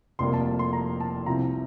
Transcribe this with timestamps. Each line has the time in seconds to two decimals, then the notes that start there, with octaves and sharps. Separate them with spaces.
0.19 F1 F2 C3 G3 A#3 C6
0.33 A5
0.46 A5
0.59 C6
0.73 A#5
1.00 A5
1.26 C2 C3 F3 C4 A#5